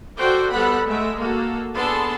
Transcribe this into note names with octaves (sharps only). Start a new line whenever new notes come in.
F#4 A4 C5 D5 G5
G3 B3 A4 F#5 B5
G#3 A3 E5
A#3 F#4 A4
B3 D4 G#4 A4 A5 C6